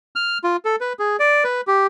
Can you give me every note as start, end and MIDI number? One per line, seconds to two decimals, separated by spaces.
0.16 0.38 89
0.44 0.56 65
0.65 0.76 69
0.81 0.93 71
0.99 1.16 68
1.19 1.44 74
1.44 1.61 71
1.67 1.87 67